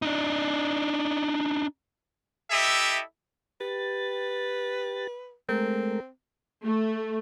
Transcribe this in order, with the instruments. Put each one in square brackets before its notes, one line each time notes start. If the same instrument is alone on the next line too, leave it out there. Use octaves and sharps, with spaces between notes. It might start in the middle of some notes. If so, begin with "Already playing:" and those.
[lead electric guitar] D4 D#4
[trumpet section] E4 G4 A4 D#5 E5
[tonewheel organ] G4 A6 [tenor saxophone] B4
[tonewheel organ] G#3 A3 A#4 [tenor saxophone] C4
[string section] A3